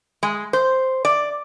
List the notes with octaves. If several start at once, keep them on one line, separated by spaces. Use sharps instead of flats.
G#3
C5
D5